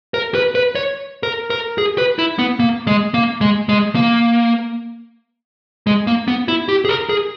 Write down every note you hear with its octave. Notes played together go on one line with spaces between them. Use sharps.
A#4
B4
B4
C#5
A#4
A#4
G#4
B4
E4
B3
A#3
G#3
A#3
G#3
G#3
A#3
G#3
A#3
B3
E4
G4
G#4
A#4
G#4